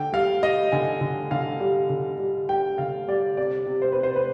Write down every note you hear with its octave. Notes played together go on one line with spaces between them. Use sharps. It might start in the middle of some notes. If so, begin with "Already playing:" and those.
Already playing: D3 G5
G3 F5
G3 D#5
D3 G#5
D3
D3 F5
G3
D3
G3
G3 G5
D3 F5
G3 D5
C3 D5
C3
C5
C3 B4
C5
B4